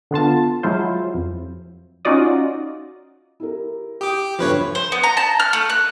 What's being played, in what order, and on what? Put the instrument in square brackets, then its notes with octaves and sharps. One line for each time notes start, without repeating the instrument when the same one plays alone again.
[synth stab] D3 B3 F4 A5
F#3 G#3 E4 F4 C5
F2
C#4 D#4 F4 F#4 D5 D#5
[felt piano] E4 G4 A#4
[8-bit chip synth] G4 D6 [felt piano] D#6 G6
[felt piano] G1 D2 [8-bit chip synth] F3 B4 C#5
[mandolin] C5
B3
A#5
A5
F6
A3
F#6